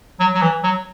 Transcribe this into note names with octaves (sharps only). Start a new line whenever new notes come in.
F#3
F#3
E3
F#3